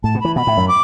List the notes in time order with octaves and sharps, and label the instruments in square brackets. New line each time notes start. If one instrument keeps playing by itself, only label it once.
[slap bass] A2 [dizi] A5
[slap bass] B2
[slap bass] E3 [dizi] B5
[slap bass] B2 [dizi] B5
[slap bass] A2
F#2
[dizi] D6